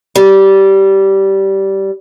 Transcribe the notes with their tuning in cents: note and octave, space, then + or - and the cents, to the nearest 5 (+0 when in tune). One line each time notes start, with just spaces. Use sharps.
G3 -15